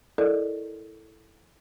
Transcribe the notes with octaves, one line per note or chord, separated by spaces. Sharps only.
E4 A4 A#4 D5 D#5